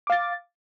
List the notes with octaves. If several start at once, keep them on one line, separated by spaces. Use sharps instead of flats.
F5 D6 A6